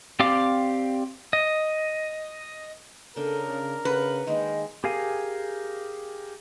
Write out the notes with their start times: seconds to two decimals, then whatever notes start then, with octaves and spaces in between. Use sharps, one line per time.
0.20 C4 G4 D5 F5 D6
1.33 D#5
3.16 C#3 D4 A4 A#4 G5
3.50 C#3 D5
3.85 C#3 B4 F#5
4.27 D#3 G#3 A#3 D#5
4.84 G4 G#4 A#4 F5 G#5